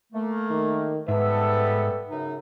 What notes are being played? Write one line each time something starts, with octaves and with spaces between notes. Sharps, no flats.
A3 A#3
D#3
G#2 G3 B3 A4 B4 E5
F#2 C#3 D#4